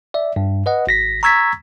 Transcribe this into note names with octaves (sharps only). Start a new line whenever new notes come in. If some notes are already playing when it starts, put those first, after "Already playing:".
D5 E5
G2
B4 D#5 F#5
G#1 A#6 B6
A#5 C#6 E6 G#6 A6 B6